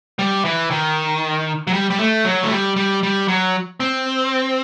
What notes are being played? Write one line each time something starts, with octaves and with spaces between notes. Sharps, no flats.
G3
E3
D#3
F#3
G3
G3
A3
F#3
A3
G3
G3
G3
F#3
C4